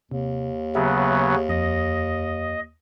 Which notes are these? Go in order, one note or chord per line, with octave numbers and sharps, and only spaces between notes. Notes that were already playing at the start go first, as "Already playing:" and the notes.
D#2 C3
C#3 F#3 B3 G4 E5
F2 D#5 A#6